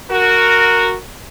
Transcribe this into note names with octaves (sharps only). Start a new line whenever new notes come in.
F#4 A#4